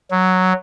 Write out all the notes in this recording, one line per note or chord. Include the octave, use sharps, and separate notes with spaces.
F#3